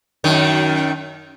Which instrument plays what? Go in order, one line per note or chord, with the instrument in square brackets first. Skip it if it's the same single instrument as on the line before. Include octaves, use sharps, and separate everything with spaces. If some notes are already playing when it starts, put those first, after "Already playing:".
[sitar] F#2 D#3